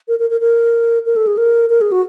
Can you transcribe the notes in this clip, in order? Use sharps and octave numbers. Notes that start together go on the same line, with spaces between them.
A#4
A#4
A#4
A#4
A#4
A4
G#4
A#4
A#4
G#4
F#4